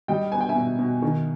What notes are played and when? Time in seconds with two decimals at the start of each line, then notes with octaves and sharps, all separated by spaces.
0.08 G3 D#5 G5
0.32 B3 G#5
0.41 G5
0.49 E5 G#5
0.55 B2
0.79 B2
1.02 D#3